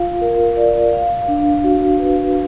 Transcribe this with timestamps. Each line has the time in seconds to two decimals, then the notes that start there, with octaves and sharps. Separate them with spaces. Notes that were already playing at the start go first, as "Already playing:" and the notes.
Already playing: F4 F5
0.21 A#4
0.57 D5
0.93 F5
1.28 D4
1.64 F#4
1.99 B4